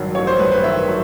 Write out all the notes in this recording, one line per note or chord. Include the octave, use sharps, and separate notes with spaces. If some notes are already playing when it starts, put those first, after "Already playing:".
Already playing: A1 G2 D#3 F#3
A1 C#5
C5
G2 B4
B4
D#3 E5
F#3